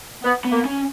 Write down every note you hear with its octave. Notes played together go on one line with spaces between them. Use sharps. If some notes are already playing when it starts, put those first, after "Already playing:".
B3
B3
A#3
C#4